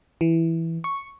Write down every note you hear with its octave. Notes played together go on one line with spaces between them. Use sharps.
E3
C#6